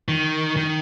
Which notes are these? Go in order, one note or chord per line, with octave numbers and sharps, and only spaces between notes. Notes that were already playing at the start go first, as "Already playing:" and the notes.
D#3
D#3